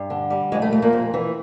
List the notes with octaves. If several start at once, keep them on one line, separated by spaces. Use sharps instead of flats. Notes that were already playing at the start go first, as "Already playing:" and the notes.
Already playing: G2
D3
G3
F2 G#3
A3
F2 A3
A#2 A#3
F2
E3